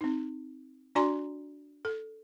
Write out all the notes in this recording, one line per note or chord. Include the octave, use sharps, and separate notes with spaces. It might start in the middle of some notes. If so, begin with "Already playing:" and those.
C4 D#4
D4 F#4 D5 G#5 A#5 C6
A4